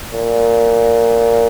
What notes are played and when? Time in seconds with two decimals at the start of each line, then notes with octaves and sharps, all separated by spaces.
0.13 A#2